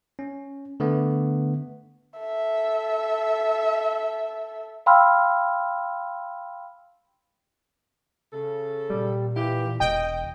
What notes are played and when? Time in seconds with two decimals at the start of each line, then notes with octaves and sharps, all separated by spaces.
0.19 C#4
0.80 D3 A3 B3
2.20 A4 E5
4.86 F5 G5 B5 C6 E6 F6
8.33 C#3 A4
8.90 A#2 G3
9.36 E3 E4 F4 G4
9.80 E1 B2 D#5 G5